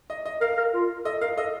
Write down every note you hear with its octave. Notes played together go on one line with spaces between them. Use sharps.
D#5
D#5
A#4 F5
A#4
F4
A4 D#5
A#4 F5
A4 D#5